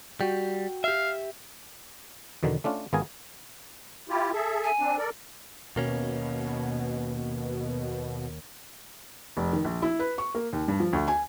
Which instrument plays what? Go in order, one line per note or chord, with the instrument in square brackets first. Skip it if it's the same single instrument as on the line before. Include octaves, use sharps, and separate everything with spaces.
[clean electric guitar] G3 [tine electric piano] F#4 G5
[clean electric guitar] G4 E5 [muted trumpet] F5
[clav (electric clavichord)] E2 B2 D3 D#3
A3 C#4 D4 F4
G#1 B3 F4 G#4 A#4 G#5
[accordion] E4 F4 G4
G#4 A4 E5
[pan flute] G#5
[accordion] C4 D4
A4 A#4 D5
[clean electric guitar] D#2 A#3 C#4 [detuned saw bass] B2
[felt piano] F1
D#3
A#1
E4
B4
C#6
A#3
D#2
G2
F3
D2
G#5